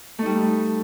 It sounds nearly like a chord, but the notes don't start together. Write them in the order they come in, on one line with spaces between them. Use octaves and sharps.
A3 D#4 G3